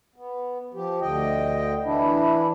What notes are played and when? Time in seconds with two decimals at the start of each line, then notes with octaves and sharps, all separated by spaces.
0.16 B3
0.74 F3 G4
1.01 D2 D3 D#5 G5
1.84 E3 D4 E4